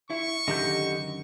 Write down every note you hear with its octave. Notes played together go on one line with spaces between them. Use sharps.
E4 E5 C#6
F#2 D3 D#3 G4 A4 D#5 F#5 G6